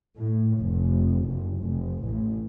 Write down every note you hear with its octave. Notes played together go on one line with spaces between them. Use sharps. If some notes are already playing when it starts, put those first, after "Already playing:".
A2
F1
F#1
F1
A1